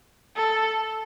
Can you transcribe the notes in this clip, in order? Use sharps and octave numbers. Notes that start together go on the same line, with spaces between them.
A4